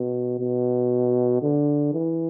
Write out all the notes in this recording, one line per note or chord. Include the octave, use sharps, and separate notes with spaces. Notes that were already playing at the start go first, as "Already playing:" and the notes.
Already playing: B2
B2
D3
E3